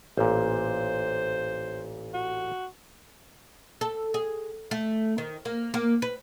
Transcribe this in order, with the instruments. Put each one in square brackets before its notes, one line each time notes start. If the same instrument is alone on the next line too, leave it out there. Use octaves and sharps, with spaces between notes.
[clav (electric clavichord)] A1 A#2 [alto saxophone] C5
[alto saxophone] F#4
[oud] A4
G#4
A3
D#3
A#3
A#3
B4